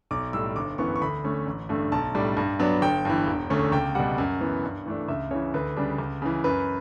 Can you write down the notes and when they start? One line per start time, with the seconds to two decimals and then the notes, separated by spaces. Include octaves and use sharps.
0.11 B1 D6
0.33 A2 G3 E6
0.56 G1 D6
0.78 F#2 E3 B3 C#6
0.96 C#6
1.01 D2 B5
1.24 D3 A3 C#4
1.46 A1
1.69 G2 D3 A3
1.92 B1 A5
2.14 A2 G3 D4
2.37 G2
2.59 F#3 B3 D4
2.82 G1 G5
3.05 G2 E3
3.27 E1
3.50 D2 D3 A3 C#4
3.72 C#2 G5
3.95 B2 G3 F#5
4.18 F#2
4.41 E3 B3
4.63 G2
4.86 E3 A3 D4
5.08 C#2 E5
5.31 C#3 E3 C#5
5.54 D2 B4
5.76 C#3 G3 D4
5.98 C#2
6.22 C#3 E3
6.44 F#2 B4